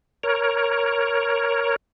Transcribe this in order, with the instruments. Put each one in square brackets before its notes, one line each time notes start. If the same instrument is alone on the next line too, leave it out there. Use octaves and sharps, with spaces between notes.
[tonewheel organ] A#4 C#5